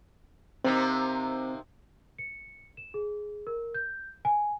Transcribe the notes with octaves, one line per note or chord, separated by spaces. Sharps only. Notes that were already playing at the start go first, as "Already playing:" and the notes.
C3 A#3 C4 D#4 C5
C#7
E7
G#4
A#4
G6
G#5